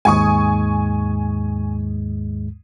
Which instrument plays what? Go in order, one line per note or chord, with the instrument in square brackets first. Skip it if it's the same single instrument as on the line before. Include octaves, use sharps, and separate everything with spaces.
[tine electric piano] D#2 G#2 G#3 [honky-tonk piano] G#5 C#6 D#6